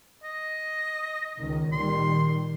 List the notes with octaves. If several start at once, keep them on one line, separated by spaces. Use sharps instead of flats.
D#5
C#2 D#3
A#2 D#3 G3 C6